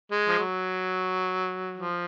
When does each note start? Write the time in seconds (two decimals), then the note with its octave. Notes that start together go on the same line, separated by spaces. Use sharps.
0.11 G#3
0.28 F3
0.39 F#3
1.78 F3